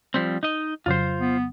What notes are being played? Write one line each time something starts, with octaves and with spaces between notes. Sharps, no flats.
F3 G3 C4
D#4 D#5
F2 C#3 F#3 F4 C5
B3